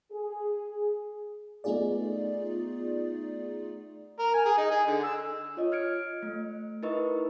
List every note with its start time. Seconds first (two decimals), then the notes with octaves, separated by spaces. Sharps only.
0.12 G#4
1.64 A3 B3 D#4 F4 G#4 D5
4.19 A#4
4.34 G#5
4.45 G#4
4.58 D#4
4.71 G#4
4.86 D3
5.04 E6
5.57 F4 C#5 D#5
5.72 F6 G#6 C#7 D7
6.23 A3
6.83 D#4 E4 A#4 B4 D#5 C#6